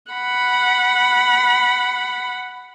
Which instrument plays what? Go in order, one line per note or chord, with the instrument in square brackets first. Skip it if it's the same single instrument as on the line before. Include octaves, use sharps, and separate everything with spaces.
[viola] F#5 B5